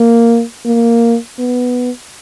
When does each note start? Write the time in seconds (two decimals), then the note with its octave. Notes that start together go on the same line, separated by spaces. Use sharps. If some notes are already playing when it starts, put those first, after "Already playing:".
Already playing: A#3
0.66 A#3
1.39 B3